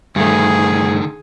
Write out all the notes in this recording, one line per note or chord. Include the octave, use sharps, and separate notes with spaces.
G2 D3 D#3 A3 G#4